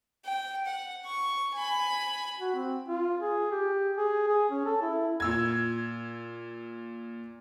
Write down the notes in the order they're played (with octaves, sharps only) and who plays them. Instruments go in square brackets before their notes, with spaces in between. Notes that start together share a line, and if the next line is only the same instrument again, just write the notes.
[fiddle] G5
F#5
C#6
G#5 B5
[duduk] F#4
C4
F4
G#4
G4
G#4
G#4
C#4
A4
E4
[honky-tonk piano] A#2 E6 G#6